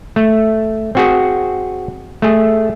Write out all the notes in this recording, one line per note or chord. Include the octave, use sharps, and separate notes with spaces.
A3
C4 F#4 G#4
A3 G#4